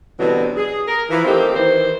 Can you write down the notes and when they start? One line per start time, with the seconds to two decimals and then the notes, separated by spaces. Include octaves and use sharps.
0.18 B2 D3 E3 F#3 G3 C4
0.56 G#4
0.87 A#4
1.10 E3 F3
1.25 A3 A#3 C4 D#4 G4
1.54 D#3 E3 C5